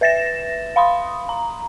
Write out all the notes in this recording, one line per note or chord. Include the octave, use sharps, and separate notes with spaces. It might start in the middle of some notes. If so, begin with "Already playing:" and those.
B4 E5 A6 A#6 E7
F5 B5 C6 D#6
A#5